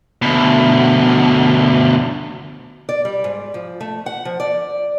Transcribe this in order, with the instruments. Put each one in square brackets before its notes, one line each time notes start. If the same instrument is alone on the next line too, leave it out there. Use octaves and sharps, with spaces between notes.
[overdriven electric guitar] D2 B2
[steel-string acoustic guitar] D5
G3
G#2
F3
A3
F#5
F3
D5